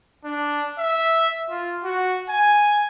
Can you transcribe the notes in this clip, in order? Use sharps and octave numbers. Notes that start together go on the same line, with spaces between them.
D4
E5
F4
F#4
G#5